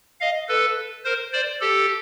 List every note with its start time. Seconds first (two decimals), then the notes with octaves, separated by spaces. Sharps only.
0.20 D#5 F5
0.49 A4 B4
1.05 A#4 C5
1.33 C5 D5
1.61 G4 A4